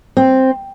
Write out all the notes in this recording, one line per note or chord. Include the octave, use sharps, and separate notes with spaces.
C4